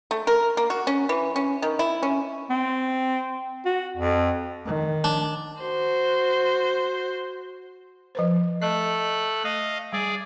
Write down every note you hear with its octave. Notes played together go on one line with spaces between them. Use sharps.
A3
A#4
A#3
F#4
C#4
E3
C#4
D#3
E4
C#4
C4
F#4
F2
D#3
D4
F#4 C5
F3 B4 C5
A3 D#5 F#6
D#5 F5
G3 G#4 D5